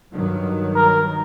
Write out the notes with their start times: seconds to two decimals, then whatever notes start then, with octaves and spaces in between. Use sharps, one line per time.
0.12 G2 D#3 F#3
0.76 A#4